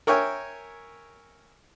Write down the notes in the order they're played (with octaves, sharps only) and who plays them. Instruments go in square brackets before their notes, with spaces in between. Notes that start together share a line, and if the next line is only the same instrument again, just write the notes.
[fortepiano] A#4 C#5 E5 G5 G#5